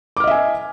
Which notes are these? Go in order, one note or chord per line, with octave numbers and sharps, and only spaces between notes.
D#5 E5 G#5 D6 F6